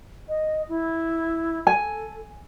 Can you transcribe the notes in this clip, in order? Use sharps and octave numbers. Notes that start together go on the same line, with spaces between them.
D#5
E4
A4 G#5